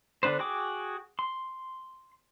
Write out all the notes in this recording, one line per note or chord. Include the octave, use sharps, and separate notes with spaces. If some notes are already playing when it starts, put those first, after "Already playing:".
D3 B3 D4 B4 C5
F#4 G#4 G5 D6
C6